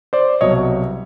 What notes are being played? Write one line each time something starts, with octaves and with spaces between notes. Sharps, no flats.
C5 D5
C2 B2 F#3 C#5 D#5